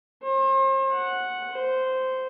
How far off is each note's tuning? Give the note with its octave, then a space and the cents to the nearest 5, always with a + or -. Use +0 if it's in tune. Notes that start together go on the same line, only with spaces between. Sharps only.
C5 +40
F#5 -5
C5 -10